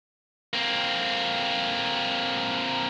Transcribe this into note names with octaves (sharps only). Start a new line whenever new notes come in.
A#3 C4